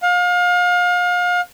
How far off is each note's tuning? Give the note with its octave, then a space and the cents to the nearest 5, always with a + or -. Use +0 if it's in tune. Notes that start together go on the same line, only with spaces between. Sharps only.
F5 +35